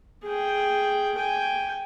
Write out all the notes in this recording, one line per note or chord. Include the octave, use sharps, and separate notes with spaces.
G#4 G5
G5 G#5